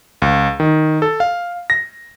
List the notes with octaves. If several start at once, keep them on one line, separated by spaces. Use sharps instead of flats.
C#2
D#3
A4
F5
A#6